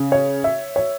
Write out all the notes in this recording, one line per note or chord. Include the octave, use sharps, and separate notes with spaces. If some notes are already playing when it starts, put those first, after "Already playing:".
Already playing: C#3
C#5
E5
C#5